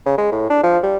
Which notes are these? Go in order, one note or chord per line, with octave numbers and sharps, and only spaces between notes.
C#3
G#3
A2
D4
F3
G3